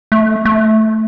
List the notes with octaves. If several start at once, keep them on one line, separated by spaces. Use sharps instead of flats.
A3
A3